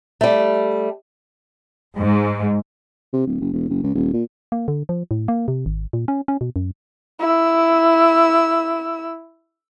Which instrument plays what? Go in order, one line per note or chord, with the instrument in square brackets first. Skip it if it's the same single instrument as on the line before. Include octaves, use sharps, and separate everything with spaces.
[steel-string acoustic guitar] G3 A3
[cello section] G#2
[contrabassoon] C3
D1
F#1
E1
F#1
C#2
D#1
A#2
[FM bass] A#3
D3
F3
A2
A#3
C3
G#1
A#2
C#4
C#4
B2
F#2
[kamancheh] E4 E6